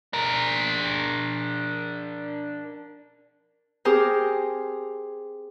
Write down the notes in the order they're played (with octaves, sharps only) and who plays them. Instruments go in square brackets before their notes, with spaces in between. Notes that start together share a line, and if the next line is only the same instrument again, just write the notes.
[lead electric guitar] D4 A#4
[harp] C4 G4 G#4 A#4 C5